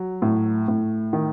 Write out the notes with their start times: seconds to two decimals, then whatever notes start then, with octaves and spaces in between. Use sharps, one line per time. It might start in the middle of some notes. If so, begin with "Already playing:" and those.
Already playing: F#3
0.22 A2
0.68 A2
1.13 D#3